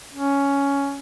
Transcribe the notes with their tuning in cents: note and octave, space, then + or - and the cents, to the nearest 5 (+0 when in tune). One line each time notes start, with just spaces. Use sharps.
C#4 +10